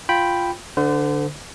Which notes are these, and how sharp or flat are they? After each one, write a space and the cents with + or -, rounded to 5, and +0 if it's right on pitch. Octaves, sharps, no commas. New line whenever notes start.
F4 +0 G5 +0 B5 +0
D3 +0 C5 -40